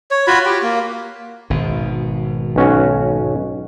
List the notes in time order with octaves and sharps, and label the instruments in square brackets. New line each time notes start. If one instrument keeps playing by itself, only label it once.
[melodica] C#5
F4 F#4 B5
G4 G5
A#3
[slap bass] G#1 B2
[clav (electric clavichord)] B1 C#4 F#4